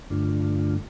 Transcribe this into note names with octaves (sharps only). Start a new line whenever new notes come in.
G2 D3 A3 D4 F4